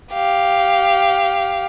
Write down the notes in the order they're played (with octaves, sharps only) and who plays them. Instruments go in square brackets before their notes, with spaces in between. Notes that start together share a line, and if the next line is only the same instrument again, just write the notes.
[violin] G4 F5